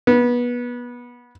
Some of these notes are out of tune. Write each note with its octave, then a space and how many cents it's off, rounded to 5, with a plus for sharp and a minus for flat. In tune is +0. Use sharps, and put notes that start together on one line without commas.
B3 -25